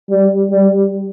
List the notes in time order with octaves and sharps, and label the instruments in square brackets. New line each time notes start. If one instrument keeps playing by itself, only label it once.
[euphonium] G3
G3